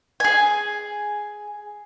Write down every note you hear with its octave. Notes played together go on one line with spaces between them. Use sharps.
G#4 G#5